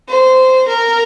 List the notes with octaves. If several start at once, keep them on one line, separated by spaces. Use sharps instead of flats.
C5
A#4